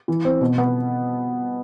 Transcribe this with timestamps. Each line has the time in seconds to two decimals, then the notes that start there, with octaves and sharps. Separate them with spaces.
0.08 E3
0.25 C4
0.41 B2
0.58 B3